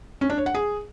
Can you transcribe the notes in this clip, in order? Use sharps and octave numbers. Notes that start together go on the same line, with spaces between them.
C#4
D4
C#5
F#5
G#4